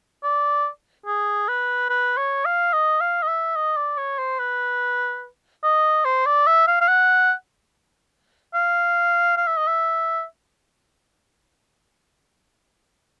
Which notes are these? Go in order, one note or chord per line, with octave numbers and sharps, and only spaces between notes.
D5
G#4
B4
B4
C#5
F5
D#5
F5
D#5
E5
D#5
D5
C#5
C5
B4
D#5
C5
D5
E5
F5
F5
F#5
F5
F5
E5
D#5
E5